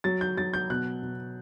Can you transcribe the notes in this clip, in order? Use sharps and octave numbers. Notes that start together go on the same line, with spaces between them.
F#3 A6
G6
F#3 A6
G6
B2 F#6
B2